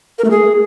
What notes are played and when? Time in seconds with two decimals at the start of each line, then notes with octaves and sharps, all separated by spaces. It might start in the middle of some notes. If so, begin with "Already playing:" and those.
0.19 A#4
0.25 A3
0.31 G#4